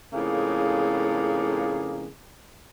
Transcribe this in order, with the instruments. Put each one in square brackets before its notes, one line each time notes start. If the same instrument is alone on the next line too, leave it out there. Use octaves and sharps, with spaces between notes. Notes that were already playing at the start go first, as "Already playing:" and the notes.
[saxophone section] F2 A2 C#3 A#3 G#4